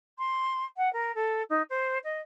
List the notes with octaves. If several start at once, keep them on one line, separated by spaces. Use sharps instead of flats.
C6
F#5
A#4
A4
D#4
C5
D#5